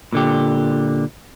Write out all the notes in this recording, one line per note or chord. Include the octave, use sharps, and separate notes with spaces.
A#2 D3 G4